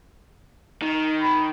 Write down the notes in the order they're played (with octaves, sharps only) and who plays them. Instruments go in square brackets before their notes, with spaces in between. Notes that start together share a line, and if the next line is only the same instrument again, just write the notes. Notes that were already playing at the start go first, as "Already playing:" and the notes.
[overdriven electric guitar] D#3
[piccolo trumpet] B5